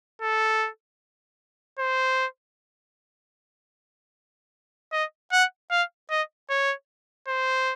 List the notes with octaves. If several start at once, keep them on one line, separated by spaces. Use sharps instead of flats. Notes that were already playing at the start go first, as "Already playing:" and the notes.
A4
C5
D#5
F#5
F5
D#5
C#5
C5